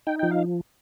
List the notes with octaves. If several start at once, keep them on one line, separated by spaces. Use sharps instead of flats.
D#4 G5
F3 G5
F5